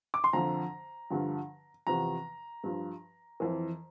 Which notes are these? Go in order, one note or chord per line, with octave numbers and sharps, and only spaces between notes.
D6
C6
F2 D3 F3 A#5
G2 D3 F3
E2 C3 F3 A#5
G2 F3
F2 E3